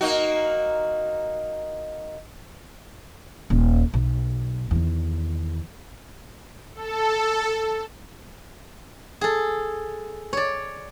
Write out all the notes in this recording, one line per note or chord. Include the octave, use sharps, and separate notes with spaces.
A#3 D#4 F#4
D#1
B1
E2 D#3
A4
G#4 A4
C#5 D5